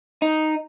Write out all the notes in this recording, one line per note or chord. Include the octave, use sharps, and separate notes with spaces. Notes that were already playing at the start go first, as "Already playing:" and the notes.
D#4